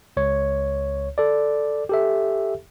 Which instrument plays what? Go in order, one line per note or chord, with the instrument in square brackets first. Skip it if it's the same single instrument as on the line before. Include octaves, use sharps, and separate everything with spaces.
[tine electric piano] C#2 C#5
A4 D5
G4 A4 E5